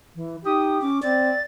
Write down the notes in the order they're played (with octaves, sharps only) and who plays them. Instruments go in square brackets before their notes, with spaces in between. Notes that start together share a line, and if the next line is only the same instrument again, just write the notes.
[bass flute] E3
[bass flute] D#4 [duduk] G4 [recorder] D#6
[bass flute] C#4 [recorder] D6
[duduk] C4 [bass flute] D5 [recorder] A6